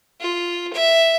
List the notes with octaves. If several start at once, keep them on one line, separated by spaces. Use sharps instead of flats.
F4
E5